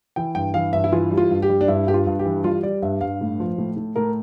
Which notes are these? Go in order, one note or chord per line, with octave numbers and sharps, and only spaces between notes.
E3 G5
G2 G5
E3 F5
G2 E5
E4
E3 F4
G3
F4
G2
G4
G3
D4
G2 E4
G2 G4
F4
G2
G4
E3
G3 F4
G3 D5
G2 E5
G2 F5
A2
F3
A2
A2
A2 A#4